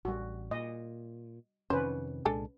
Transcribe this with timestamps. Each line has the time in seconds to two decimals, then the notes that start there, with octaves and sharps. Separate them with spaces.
0.05 A1 G3 F#4
0.51 A#2 D#5
1.70 F2 C3 D#3 C#4 B4 C5
2.25 C2 A#2 G#3 D4 A4 G#5